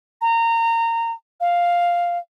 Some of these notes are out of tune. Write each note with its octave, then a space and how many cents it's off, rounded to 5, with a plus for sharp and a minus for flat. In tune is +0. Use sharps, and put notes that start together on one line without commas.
A#5 -20
F5 +0